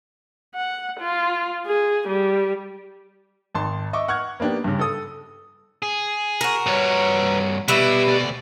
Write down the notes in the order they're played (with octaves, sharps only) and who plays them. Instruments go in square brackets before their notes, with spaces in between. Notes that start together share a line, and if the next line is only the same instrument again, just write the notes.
[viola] F#5
F4
G#4
G3
[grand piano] G#1 A5 C6
D#5 E5 C#6 D6
F#5 C#6 F6 F#6 G#6
A#3 B3 D4 G4
G2 C#3
A4 D#6
[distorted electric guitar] G#4
[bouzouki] F#4 A#4
[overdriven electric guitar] G2 C#5 [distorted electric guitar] B4 A#5
[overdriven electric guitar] B2 [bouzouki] G3 B4 E5 [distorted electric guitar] E4
[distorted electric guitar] D2 D5